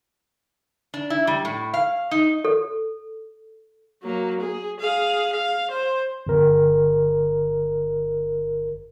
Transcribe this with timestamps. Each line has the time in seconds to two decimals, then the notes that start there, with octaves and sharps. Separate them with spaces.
0.94 D4
1.10 E4
1.27 G3
1.45 A2
1.74 F5
2.11 D#4
2.45 A4
4.03 F#3 A#3
4.40 G#4
4.80 G#4 F5
5.33 F5
5.71 C5
6.27 G1 A#4